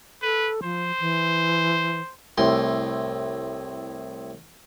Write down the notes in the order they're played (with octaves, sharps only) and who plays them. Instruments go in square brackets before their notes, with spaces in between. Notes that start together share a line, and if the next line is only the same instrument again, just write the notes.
[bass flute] A4 [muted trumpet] B4
[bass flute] F3 [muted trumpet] C5
[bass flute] E3
[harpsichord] C2 A2 C6